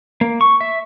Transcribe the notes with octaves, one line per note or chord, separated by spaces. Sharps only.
A#3
C#6
E5